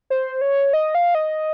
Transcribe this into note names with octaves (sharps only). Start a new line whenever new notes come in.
C5
C#5
D#5
F5
D#5